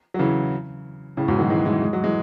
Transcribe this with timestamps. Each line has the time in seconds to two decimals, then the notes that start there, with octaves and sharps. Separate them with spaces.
0.14 F#3
0.19 C#3 E3
1.17 A2 C#3
1.28 G#2 B2
1.39 D#3 F#3
1.49 E3 G#3
1.66 E3 G#3
1.82 G#3
1.93 F#3
2.04 E3 G#3